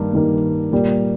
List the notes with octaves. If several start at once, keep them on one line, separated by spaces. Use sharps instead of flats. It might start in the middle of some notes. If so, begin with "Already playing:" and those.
Already playing: G2 D#3 A#3
G2 D#3 A#3
A#2 G3 A#3